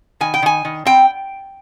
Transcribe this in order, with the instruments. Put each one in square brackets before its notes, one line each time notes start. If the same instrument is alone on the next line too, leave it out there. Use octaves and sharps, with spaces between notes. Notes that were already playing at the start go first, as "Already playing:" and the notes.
[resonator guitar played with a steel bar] D#3 G#5
G5
D#3 G#5
D#3
C4 G5